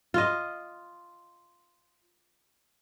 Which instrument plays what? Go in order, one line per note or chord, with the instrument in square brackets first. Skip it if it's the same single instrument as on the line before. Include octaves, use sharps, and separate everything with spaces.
[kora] F4 D#5